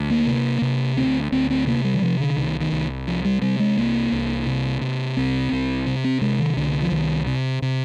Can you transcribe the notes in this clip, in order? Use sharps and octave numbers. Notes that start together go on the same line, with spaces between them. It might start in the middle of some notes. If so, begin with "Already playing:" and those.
Already playing: D2
A#3
C3
C3
D2 C4
D2 C4
C4
C3 A#3
G3
D#3
C3 F3
D3
C2 D#3
D#3
C2
C3 F3
G3
C3 G3
G#3
C2 A#3
C2
C3
C3
C2 C4
C2
C3
C4
C3 G#3
D#3
C2 D3
F3
C2 D#3
C3
C3